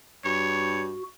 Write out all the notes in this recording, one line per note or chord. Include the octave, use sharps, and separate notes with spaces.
G2 F#4 C#5